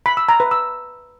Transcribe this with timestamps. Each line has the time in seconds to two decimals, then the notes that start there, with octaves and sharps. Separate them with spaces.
0.06 B5
0.17 E6
0.29 A#5
0.40 B4
0.51 E6